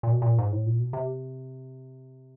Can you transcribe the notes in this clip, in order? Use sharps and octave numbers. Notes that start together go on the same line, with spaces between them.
A#2
B2
A#2
G#2
A2
A#2
B2
C3